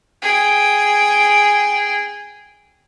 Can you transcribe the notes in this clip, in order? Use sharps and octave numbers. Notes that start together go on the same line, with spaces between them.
G#4 G5